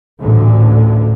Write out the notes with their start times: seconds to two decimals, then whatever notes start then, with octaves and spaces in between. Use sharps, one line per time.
0.21 A1 D2 A#2 D3